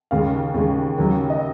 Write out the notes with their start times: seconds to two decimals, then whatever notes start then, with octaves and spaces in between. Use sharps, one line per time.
0.11 D#2 C#3 G#3 F5
0.54 D#2 C#3 G#3
0.98 D#2 C#3 F#3
1.30 D#5